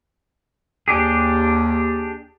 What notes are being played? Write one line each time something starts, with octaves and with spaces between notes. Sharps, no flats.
D#2 D4 G4 G#4